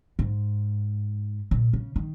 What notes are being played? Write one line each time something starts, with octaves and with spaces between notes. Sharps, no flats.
G#2
A#2
C#3
D#3